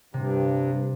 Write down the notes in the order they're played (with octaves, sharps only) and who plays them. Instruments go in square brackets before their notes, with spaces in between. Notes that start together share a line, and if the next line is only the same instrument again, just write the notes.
[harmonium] G2 [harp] C3